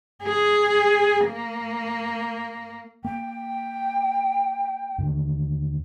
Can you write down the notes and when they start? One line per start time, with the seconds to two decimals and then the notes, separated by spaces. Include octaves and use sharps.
0.24 G#4
1.26 A#3
3.05 A#3 G5
4.98 D#2 D3